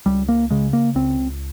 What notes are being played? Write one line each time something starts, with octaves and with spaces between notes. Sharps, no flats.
C#2 G3
A#3
C#3 G#3
A#3
C#2 C4